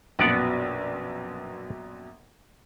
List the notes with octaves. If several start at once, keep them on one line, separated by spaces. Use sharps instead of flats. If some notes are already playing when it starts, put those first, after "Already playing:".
A#1 F#2 B2 B3 D5 F#5